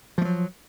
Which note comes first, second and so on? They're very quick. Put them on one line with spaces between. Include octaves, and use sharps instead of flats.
F3 A3 F#3